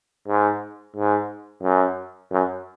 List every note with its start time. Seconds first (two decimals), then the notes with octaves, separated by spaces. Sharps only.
0.28 G#2
0.97 G#2
1.63 F#2
2.31 F#2